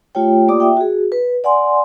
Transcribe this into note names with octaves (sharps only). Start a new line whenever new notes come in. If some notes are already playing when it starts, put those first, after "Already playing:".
A3 F4 G4 C#5 G5
A#3 F4 G4 D5 D6 D#6
E5 G5
F#4 G#4
B4
D5 F#5 G#5 C6